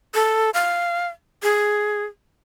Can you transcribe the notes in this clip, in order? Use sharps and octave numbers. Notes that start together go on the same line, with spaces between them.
A4
F5
G#4